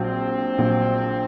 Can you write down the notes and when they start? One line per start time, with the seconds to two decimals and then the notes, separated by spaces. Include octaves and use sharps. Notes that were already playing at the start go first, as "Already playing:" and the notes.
Already playing: A#1 A#2 F#3 C4
0.58 A#1 A#2 F#3